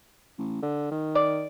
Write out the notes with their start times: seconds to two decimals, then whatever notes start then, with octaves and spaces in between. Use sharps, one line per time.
0.38 A1
0.63 D3
0.91 D#3
1.15 D5